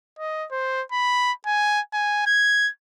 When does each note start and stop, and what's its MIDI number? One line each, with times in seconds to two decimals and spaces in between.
0.19 0.46 75
0.51 0.82 72
0.92 1.32 83
1.46 1.81 80
1.94 2.27 80
2.27 2.69 92